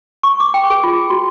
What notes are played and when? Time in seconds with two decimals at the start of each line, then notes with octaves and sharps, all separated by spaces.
0.23 C#6
0.40 D6
0.54 G5
0.70 G#4
0.84 F4
1.10 F#4